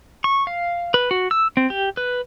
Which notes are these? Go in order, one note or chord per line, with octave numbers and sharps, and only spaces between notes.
C#6
F5
B4
F#4
E6
C4
G4
B4